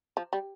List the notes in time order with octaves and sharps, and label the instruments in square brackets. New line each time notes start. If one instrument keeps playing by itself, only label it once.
[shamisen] F3
G3